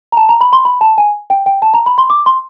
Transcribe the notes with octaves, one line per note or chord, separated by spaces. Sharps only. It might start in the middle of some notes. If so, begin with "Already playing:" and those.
A#5
A5
A#5
B5
C6
B5
A5
G#5
G5
G5
A5
A#5
B5
C6
D6
C6